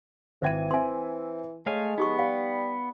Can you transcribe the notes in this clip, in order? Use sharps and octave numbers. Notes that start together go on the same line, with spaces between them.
G#1 E3 C5 E5 G5 G#6 D#7
C4 E5 G#5 C6
G#3 A3 C#5 F5 G#5
B3 D#4 G4 C#6
G3 D5 F5